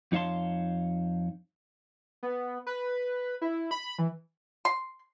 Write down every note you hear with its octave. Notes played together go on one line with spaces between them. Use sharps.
F2 D#4 C#5 F5 A5 C6
B3
B4
E4
B5
E3
C6